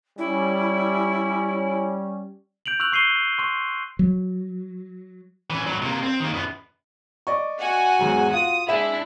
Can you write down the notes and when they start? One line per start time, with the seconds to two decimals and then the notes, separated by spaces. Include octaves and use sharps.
0.18 G3 C#4 E4
2.66 G6 D7 F7 F#7
2.80 C#6 E6 F#6 G6 F7 F#7
2.92 C#6 C7 D#7 G7
3.39 C6 C#6
3.99 F#3
5.50 E3 C#4
5.66 A2 F#3
5.82 C3 A#3
6.03 C4
6.20 D#3 A#3
6.34 F#2 B3
7.27 D5 D#5 C#6
7.60 F#4 F#5 G#5
7.99 E2 G#2 F#3
8.33 F4 D#6
8.68 G#3 D4 E4 E5 E7